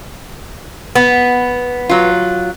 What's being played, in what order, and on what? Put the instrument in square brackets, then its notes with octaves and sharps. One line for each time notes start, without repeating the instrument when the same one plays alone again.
[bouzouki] B3
[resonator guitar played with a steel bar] F#3 F4